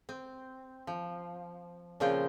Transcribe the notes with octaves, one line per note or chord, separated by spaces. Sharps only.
C4
F3
A#2 C#3 F3 C4 F4 G5